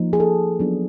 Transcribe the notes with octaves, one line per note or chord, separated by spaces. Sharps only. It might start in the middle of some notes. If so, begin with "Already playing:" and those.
Already playing: F3 A#3 D#4
G#4
A4
F#3 B3 D4 F4